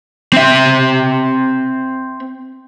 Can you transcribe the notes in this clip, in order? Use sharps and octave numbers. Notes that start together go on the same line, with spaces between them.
C4 E5